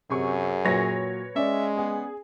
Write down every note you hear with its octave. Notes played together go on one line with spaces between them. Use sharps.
F#2 C3 G#4 C#6
A#2 F#3 B4 C#5 A#6
G#3 C#4 D5 E5
B3 G#4